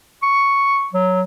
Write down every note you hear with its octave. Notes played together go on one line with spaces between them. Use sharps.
C#6
F#3